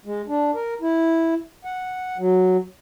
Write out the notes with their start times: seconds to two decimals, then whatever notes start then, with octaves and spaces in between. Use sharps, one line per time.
0.05 G#3
0.28 D4
0.54 A#4
0.81 E4
1.65 F#5
2.18 F#3